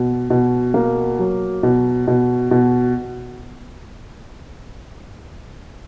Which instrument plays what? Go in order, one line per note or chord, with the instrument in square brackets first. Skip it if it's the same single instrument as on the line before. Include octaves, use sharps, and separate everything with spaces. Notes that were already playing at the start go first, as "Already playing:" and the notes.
Already playing: [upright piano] B2
B2
A#3
F#3
B2
B2
B2